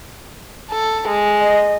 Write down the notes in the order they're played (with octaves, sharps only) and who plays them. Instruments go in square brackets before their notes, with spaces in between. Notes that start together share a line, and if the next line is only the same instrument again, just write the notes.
[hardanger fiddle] A4
G#3
[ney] D#5